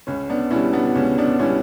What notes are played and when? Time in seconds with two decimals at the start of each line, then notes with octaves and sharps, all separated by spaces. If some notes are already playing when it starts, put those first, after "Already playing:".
0.07 C#2 C#4
0.30 B3 D4
0.51 B2 G3 C#4 E4
0.73 B3 D4
0.95 C#2 C#4
1.18 B3 D4
1.39 B2 G3 C#4 E4